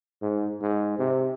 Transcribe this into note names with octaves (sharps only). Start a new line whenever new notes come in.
G#2
G#2
C3